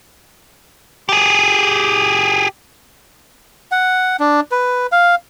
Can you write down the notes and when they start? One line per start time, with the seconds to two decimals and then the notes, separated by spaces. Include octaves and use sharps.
1.09 G4 G#4
3.72 F#5
4.20 D4
4.52 B4
4.92 F5